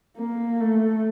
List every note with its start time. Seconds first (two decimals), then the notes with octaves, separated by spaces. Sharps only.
0.17 A#3
0.60 A3